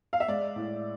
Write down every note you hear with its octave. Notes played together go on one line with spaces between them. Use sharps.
F5
E5
G#3 D5
A2